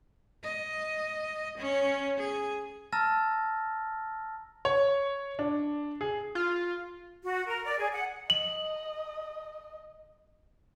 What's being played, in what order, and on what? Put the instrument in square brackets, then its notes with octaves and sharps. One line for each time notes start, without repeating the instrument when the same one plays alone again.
[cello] D#5
C#4 C#5
G#4
[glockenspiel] A5 A#5 E6 F6 A6 A#6
[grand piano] C#5
D4
G#4
[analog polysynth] F4
[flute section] F#4
A#4
D5
G#4
F#5
[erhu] D#5 [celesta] F#7